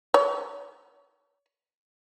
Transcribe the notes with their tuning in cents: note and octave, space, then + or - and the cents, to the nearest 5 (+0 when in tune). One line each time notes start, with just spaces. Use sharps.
C#5 +35